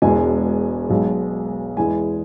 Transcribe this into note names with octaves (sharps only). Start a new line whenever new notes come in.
E1 E2 B2 G#3 G#5
B1 B2 G#3
E2 E3 G#3 G#5